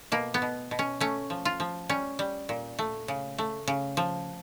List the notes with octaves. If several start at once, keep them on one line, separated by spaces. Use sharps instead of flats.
B2 A#3
B3
B2
B2
C#4
A3 C#4
F3
F4
F3
G3 C#4
G3
A#2
A3
C#3
A3
C#3
F3